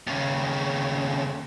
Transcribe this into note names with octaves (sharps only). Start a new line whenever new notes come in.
D#2 C#3